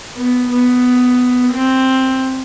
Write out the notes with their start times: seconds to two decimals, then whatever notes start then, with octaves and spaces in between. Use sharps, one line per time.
0.16 B3
0.51 B3
1.52 C4